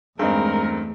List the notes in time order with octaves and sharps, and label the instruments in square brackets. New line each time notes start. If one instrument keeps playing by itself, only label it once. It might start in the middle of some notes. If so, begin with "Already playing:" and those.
[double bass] E2 A3 [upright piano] G2 C4 D#4 [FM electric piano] G#3 G#4 [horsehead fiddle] A#4